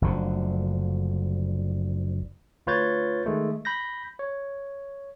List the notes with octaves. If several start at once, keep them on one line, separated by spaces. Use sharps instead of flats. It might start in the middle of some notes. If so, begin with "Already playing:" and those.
F#1 D2 D3 F3
D2 F4 B4 C#5 G6 A6
D#3 G#3 A3
B5 G6 A#6
C#5